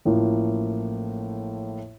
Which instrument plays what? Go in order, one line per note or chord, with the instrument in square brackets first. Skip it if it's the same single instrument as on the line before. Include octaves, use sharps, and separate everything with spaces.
[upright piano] A1 A2 F3 A#3